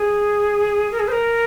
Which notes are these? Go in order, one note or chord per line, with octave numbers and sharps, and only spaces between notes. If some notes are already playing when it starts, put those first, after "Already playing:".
Already playing: G#4
A#4
G#4
C5
A#4